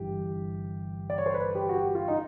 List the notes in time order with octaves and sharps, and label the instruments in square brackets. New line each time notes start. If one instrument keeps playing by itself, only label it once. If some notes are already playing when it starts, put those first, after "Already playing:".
Already playing: [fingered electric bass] G1 G2 E3 [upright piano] G4
[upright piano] D5
C#5
C5
B4
G4
F#4
G4
F4
D#4